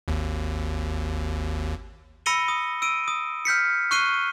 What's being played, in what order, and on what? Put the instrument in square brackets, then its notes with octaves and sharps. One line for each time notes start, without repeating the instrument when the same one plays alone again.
[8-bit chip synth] G#1 D#2
[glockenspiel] B5 E6 A#6 C#7 D#7 G7
D#6
E6 D7 D#7
D#6
F6 G6 B6 C#7
C#6 F6 F#6 C7 D#7 G7